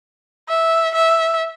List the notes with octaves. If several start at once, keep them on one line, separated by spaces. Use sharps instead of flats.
E5
E5